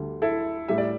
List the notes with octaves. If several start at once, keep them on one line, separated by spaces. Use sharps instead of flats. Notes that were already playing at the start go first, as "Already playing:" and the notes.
Already playing: D2 D3 G3
E4 A4
A2 G3 E5
D5